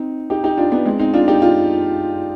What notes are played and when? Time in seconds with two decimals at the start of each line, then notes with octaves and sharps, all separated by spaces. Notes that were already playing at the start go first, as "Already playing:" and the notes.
Already playing: C4 D#4
0.30 D#4 G4
0.44 D#4 G4
0.58 D4 F4
0.72 B3 D4
0.85 G#3 C4
0.99 C4 D#4
1.14 D4 F4
1.28 D#4 G4
1.42 D4 F4